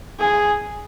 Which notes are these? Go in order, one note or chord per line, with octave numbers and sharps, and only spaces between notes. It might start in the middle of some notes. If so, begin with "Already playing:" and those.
G#4